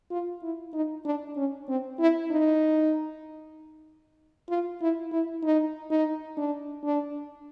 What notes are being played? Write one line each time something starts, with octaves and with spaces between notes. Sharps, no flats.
F4
E4
D#4
D4
C#4
C4
E4
D#4
F4
E4
E4
D#4
D#4
D4
D4